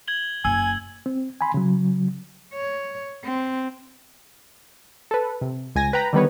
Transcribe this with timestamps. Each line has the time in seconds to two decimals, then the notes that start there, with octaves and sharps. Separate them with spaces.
0.08 G#6 F#7 G7
0.45 F#1 G#5 E6
1.06 C4
1.41 G#5 B5 C6
1.54 C#3 F#3
2.54 C#5
3.24 C4
5.11 A4 B4
5.41 C3
5.75 C#2 G#5 A#6
5.93 B4 G5 A#5 B5
6.13 D3 D#3 G3 B3 B4 C#5